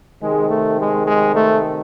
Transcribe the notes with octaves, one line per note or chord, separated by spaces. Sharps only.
C3 D#3 G#3
A3
G#3
G#3
A3